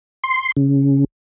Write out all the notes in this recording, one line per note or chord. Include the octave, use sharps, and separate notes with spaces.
C6
C#3